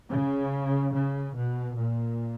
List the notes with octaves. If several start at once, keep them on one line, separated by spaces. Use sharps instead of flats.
C#3
C#3
B2
A#2